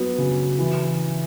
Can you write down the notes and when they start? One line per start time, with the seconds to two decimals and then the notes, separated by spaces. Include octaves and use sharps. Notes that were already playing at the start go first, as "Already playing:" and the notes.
Already playing: F#3 B3
0.18 C#3
0.59 E3